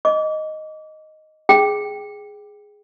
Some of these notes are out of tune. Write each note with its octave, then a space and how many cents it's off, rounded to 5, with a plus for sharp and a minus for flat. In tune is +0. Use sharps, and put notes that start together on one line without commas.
D#5 +0 D6 -30
G#4 +0 G5 +0